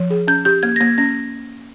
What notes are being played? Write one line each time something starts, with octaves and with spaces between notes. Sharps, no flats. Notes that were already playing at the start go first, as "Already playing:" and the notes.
Already playing: F3
G#4
C#4 G6
G4 G6
A#3 G#6
A#6
A#3 G#6
C#4 A#6